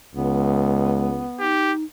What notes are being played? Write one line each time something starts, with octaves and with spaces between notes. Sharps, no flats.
C#2 G#3 B3
D#4 G4